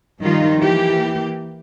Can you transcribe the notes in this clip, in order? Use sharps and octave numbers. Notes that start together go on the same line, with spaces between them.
D#3 F3 G3 D#4 F4
E3 A#3 G4